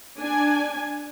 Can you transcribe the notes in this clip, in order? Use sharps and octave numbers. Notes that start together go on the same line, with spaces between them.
D4 G#5